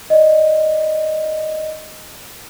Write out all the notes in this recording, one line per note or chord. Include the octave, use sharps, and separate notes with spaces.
D5 D#5